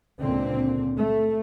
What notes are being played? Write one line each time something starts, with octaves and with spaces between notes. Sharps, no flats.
C#2 A#2 D3 C4
A3